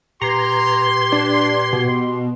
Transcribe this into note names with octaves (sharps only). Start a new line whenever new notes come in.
A#2 G4 B4 A#5 C6 G#6
D4
B2